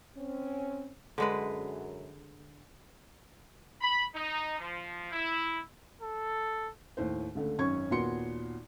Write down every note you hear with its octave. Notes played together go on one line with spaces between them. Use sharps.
C4 C#4
F#2 D3 G#3 B4
B5
D#4
F3
E4
A4
D#2 A2 C5
C#2 D3 A3
G#1 F#2 C#4 C#6 G#6
D#2 A#2 B3 F#4 C6 C#7